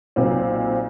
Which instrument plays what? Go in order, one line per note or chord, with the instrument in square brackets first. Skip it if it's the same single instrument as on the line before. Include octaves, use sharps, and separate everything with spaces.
[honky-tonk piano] B1 A#2 C4